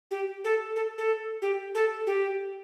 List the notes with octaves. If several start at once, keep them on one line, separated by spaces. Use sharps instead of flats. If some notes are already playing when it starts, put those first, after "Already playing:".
G4
A4
A4
A4
G4
A4
G4